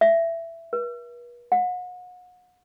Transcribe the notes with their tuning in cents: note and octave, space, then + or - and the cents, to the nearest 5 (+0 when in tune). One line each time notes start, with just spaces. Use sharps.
E5 +15
B4 -45
F#5 -35